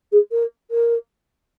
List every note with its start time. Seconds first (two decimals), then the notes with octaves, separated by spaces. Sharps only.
0.12 G#4
0.31 A#4
0.71 A#4